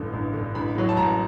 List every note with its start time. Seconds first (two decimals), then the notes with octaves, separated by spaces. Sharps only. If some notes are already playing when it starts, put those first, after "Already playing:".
Already playing: A1 G2 D3
0.13 A1
0.33 G2 D3
0.55 A1 B5
0.75 A2 F#3
0.89 A5
0.96 A1 A#5